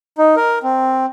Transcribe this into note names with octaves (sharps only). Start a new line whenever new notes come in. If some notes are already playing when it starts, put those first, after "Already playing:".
D#4
A#4
C4